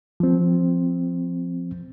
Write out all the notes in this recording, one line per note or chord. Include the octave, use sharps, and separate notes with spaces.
F3 C4